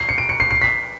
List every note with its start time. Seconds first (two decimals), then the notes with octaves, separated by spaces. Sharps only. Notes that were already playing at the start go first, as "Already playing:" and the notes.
Already playing: C7
0.09 C#7
0.18 D7
0.29 C#7
0.40 C7
0.51 C7
0.62 B6